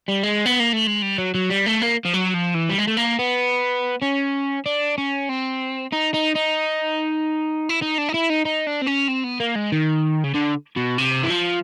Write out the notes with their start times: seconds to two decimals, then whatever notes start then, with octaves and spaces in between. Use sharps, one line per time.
0.08 G3
0.23 G#3
0.46 B3
0.60 A#3
0.73 A3
0.87 G#3
1.02 G3
1.18 F#3
1.35 F#3
1.50 G3
1.66 A3
1.81 A#3
2.05 F3
2.13 F#3
2.34 F3
2.55 E3
2.70 G3
2.78 G#3
2.88 A3
2.97 A#3
3.19 B3
4.02 C#4
4.66 D4
4.98 C#4
5.29 C4
5.93 D#4
6.14 D#4
6.35 D#4
7.69 E4
7.82 D#4
7.98 D4
8.09 D#4
8.14 E4
8.30 D#4
8.46 D#4
8.67 D4
8.82 C4
8.87 C#4
9.09 C4
9.24 B3
9.40 A#3
9.56 G#3
9.72 D#3
10.24 C#3
10.35 D3
10.77 B2
10.98 C3
11.23 E3
11.30 F3